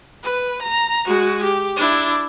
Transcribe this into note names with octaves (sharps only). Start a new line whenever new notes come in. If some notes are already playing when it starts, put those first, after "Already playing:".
B4
A#5
G#3 F#4
G4
D4 E4